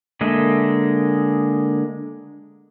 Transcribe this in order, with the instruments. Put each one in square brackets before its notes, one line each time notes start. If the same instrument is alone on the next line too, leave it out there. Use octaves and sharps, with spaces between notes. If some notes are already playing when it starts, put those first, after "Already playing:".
[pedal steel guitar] D3 G#3 A#3 D#5 E5